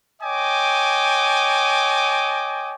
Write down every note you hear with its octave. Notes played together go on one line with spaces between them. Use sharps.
C#5 D#5 G5 G#5 D6